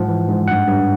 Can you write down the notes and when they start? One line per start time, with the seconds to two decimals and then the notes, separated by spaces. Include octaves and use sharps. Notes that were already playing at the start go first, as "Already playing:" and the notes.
Already playing: G#2 F3 F#5
0.08 E3
0.28 G#2
0.48 G2 F#5
0.67 G2